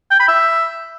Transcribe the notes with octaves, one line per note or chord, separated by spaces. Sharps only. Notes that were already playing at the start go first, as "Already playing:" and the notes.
G5
B5
E5